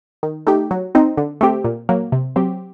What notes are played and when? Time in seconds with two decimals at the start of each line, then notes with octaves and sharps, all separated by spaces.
0.23 D#3
0.47 A3 D#4 G4
0.71 F#3
0.95 C4 D#4
1.17 D3
1.41 A3 C4 G4
1.64 A#2
1.89 F#3 A#3
2.12 C3
2.36 F#3 C4 G4